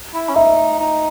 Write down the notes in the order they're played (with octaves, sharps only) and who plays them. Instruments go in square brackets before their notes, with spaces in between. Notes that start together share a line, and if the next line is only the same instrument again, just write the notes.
[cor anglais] E4
C#4
[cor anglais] D#4 [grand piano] E5
[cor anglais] D#4